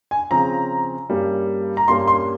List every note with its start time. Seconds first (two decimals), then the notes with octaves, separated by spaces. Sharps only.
0.11 G#5
0.31 C#3 F3 C4 A#5
1.10 G2 G3 A#3 C#4
1.77 A#5
1.88 G2 G3 A#3 C#4 C6
2.08 C6